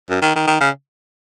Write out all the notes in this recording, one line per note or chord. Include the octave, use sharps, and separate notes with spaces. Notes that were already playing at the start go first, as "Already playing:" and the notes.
F#2
D#3
D#3
D#3
C#3